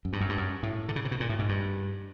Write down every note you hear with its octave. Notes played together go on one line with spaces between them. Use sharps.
F#2
G2
F#2
G2
F#2
A2
D3
C#3
C3
B2
A#2
A2
G#2
G2